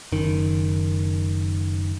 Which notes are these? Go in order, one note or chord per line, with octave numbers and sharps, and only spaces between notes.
F#1 D#3